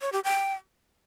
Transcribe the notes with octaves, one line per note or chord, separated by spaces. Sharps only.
C#5
G4
G5